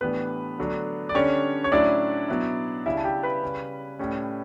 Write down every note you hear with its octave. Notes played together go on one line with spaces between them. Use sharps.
A2 E3 G3 B3 D4 B4
D3 F#3 A3 D4
D5
D3 G3 C#4 D4 C#5
C#5
A2 F#3 C#4 D4 E4 D5
B2 F#3 B3 E4
C#3 G3 C#4 E4 E5
A5
G4 G5
B4 B5
C#3 G3 C#4
A2 G3 C#4